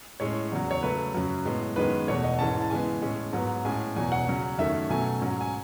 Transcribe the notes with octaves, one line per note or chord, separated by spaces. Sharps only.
A2 G#3 C#4 C#5
E2 C#3 F#3
C#5
C#3 F#3 A3 B4
F#2 C#3 F#3
A2 G#3 B3
F#2 D#3 G#3 B3 B4
E2 B2 A3 C#5
D#5
G#2 E3 G#3 C#4 A5
A5
C#3 E3 G#3 B3 G#5
A2 G#3 C#4
G#2 F#3 B3
A2 G#3 C#4 G#5
E2 B2 F#3 G#5
F#5
C#3 F#3 C#4
F#2 D#3 A3 C#4 E5
B2 F#3 A3 C#4 G#5
G#2 F#3 C#4
G#5